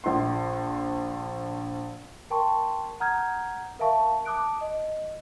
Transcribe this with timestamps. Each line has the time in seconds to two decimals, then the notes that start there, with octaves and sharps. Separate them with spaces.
0.04 A#1 C6
2.30 A#4 G5 A5 C6 C#6
3.00 F#5 A#5 D#6 F6 G6 G#6
3.79 A#4 E5 F5 A5 C#6
4.25 A5 D6 D#6 F#6 D7
4.61 D#5